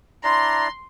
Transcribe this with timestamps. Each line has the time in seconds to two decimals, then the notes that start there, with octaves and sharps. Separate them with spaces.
0.24 D4 E4 D5 A#5 C6